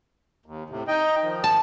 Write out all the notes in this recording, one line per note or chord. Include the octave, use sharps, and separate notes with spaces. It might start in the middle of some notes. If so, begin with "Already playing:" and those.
D#2
A2 C3
D#4 D#5 G5
D#3 F3
A5